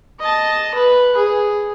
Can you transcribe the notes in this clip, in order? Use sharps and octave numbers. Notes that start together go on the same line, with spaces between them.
D#5 A5
B4
G#4